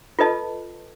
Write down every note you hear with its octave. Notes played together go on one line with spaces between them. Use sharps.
F4 A4 B4 D#5 A5